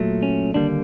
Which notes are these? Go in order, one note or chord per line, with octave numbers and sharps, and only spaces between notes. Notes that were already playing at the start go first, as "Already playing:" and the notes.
Already playing: A#2 F#3 A3
C#4
D#2 D3 G3 A#3 D4